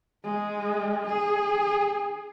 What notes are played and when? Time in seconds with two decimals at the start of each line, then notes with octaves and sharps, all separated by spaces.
0.23 G#3
1.08 G#4